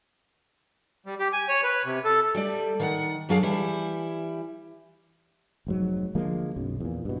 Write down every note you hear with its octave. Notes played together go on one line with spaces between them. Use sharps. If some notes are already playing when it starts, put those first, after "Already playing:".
G3
G4
G#5
C#5
B4
C3
A4
G3 A3 D5
D#3 F5 F#5
F#2 F#3 D4 G#4 F5
E3 G3 E4
F1 G#2 F#3
D3 F3 G#3 A#3
B1 F#2
E2 A#2
G2 B2